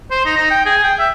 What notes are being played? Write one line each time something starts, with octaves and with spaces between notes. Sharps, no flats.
C5
D#4
D#4
G5
G#4
G5
E5